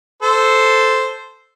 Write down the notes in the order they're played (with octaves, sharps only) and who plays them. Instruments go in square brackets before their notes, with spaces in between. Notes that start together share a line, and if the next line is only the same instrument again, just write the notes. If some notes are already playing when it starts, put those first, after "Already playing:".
[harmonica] A4 C5